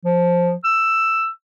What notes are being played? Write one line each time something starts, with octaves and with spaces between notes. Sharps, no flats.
F3
E6